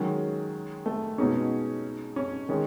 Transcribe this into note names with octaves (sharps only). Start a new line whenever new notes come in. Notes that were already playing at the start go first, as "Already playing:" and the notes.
Already playing: D#3 F#3 G#3 C#4 G#4
A3
B2 G#3 B3 C#4 D#4 G#4
C#4
D#3 G#3 C#4